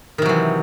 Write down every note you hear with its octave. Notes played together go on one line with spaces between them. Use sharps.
C3 D#3 E3 F#3